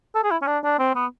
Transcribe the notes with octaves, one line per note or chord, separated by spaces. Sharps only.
A4
G#4
E4
C#4
D4
D4
C4
B3